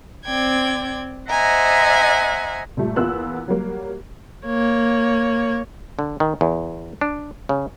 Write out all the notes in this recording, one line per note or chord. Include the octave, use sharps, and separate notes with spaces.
C4 D5 G5 G#6
C5 D#5 E5 F#5 G#5 A#5
A#2 G3 A3
E2 A#3 B3 F4 E6 F#6
F#3 G3 A#3
A#3 C#5
D3
D#3
E2
D4
C#3